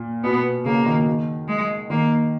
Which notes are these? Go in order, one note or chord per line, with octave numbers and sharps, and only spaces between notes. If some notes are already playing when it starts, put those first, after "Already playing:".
Already playing: A#2
B2 B3
C#3 A#3
D#3
G#3
D#3 A#3